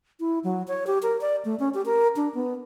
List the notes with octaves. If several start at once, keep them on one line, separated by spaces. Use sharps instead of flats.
E4
F#3
C#5
G4
A#4
D5
A3
C#4
G4
A#4
D4
B3